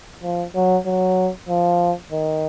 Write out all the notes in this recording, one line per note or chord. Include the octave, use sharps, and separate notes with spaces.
F3
F#3
F#3
F3
D#3